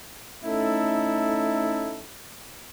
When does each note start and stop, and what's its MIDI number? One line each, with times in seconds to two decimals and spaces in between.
0.45 2.04 57
0.45 2.04 61
0.45 2.04 63
0.45 2.04 64
0.45 2.04 69